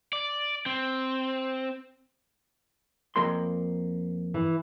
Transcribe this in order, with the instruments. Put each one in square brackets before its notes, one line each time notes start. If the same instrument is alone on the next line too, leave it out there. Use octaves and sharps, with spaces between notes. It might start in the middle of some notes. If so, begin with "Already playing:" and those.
[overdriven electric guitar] D5
C4
[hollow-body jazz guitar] F2 A#3 C6
[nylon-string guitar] E3